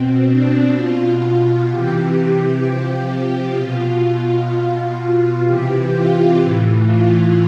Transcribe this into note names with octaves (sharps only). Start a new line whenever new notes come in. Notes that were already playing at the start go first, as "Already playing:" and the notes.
Already playing: B2 C4
D4
B2 F4
C3 E3 G4
C3 F3 G4
B2 F4
B2 F4
C3 E3 G4
F4
A2 E3
F4